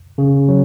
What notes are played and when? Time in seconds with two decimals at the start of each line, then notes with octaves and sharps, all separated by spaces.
0.18 C#3
0.48 F#3